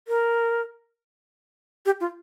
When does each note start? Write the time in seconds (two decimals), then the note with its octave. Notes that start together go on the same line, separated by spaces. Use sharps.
0.08 A#4
1.86 G4
2.01 F4